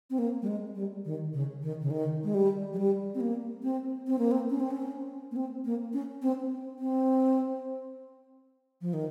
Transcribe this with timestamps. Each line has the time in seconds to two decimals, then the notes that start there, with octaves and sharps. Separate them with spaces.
0.10 C4
0.19 A#3
0.42 G3
0.47 G#3
0.75 G3
1.05 D#3
1.33 C#3
1.62 D#3
1.81 C#3
1.90 D#3
2.24 G#3
2.34 G3
2.73 F3
2.77 G3
3.15 C4
3.20 A#3
3.63 C4
4.07 C4
4.19 A#3
4.32 C4
4.50 C#4
4.60 C4
4.71 C#4
5.31 A#3
5.36 C4
5.65 A#3
5.93 C#4
6.22 C4
6.79 C4
8.81 F3
8.93 D#3